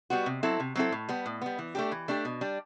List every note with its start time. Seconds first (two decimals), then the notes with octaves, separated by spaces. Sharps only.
0.10 G3 B3 F#4
0.26 C3
0.43 F#3 C4 E4 A4
0.60 C3
0.75 F#3 C4 E4 A4
0.92 A2
1.09 G3 B3
1.26 A2
1.42 G3 B3
1.59 E3
1.75 A3 D4 G4
1.92 E3
2.08 A3 D4 G4
2.25 B2
2.41 G3 D4